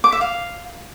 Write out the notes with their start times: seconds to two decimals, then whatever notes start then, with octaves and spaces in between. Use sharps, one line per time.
0.04 D6
0.12 E5
0.21 F5